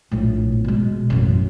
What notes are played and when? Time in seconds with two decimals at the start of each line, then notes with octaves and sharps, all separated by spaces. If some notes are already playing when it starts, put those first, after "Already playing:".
0.11 A#1 A2
0.64 B2 G#3
1.10 A1 F#2